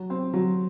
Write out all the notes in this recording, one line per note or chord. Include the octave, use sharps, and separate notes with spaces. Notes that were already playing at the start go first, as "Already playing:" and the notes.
Already playing: F#3
C4
F#3